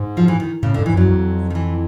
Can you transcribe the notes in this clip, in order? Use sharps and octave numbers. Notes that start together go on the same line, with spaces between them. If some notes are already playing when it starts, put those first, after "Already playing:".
Already playing: G#2
F3
E3
D#3
A2 C#3
G#2 D3
E3
F#2 F#3
F2
D#3
E3